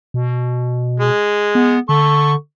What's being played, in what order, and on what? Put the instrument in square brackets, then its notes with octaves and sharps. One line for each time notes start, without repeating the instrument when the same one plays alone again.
[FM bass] B2
[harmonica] G#3
[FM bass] B3
[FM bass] D3 [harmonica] A4 C#6